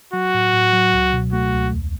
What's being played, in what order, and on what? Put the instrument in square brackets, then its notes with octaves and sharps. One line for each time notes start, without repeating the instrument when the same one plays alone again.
[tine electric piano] F#3 [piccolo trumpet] F#4
[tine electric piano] A2
A2
F#3
C#2
B2
[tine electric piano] A3 [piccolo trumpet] F#4
[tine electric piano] C#2
E2